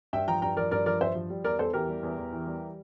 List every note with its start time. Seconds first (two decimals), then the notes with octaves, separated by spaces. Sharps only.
0.13 G2 E5 G5
0.28 F3 G5 A#5
0.42 G2 G5 A#5
0.57 F3 A#4 D5
0.71 G2 A#4 D5
0.86 F3 A#4 D5
1.01 G2 C5 E5
1.15 F3
1.30 G3
1.44 E2 A#4 D5
1.59 E2 A4 C5
1.73 E3 G4 A#4
1.89 G3
2.03 E2
2.18 E2
2.33 E3
2.47 G3